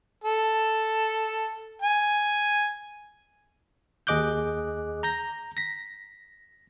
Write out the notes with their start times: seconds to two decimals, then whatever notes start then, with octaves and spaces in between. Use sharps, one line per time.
0.24 A4
1.82 G#5
4.07 D#2 G#4 D#5 D6 F#6 G6
5.03 A#5 G6 A#6
5.57 A#6 B6